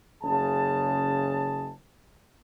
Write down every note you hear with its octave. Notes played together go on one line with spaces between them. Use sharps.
F#1 C#3 G#4 A5